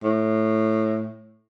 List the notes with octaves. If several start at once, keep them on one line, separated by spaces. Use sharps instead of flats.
A2